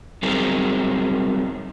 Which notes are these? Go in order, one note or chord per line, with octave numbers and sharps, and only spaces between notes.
F#3 G3 C4 D#4 G#4 A#4